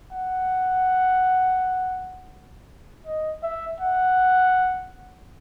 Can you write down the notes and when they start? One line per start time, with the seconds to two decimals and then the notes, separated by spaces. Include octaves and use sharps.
0.13 F#5
3.07 D#5
3.43 E5
3.80 F#5